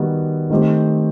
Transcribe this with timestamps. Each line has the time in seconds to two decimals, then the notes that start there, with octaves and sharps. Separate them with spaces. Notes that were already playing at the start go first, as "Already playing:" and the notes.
Already playing: D#3 G3 B3 F#4
0.50 D#3 A3 C4 D#4 G4